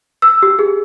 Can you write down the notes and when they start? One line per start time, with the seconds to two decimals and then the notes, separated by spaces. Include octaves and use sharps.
0.22 E6
0.43 G4
0.59 G#4